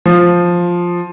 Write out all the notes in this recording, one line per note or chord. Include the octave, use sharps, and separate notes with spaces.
F3